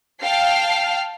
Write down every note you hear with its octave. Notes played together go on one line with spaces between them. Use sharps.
F5 G5 A5 F6 C7